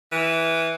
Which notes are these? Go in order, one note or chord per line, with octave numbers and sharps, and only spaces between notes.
E3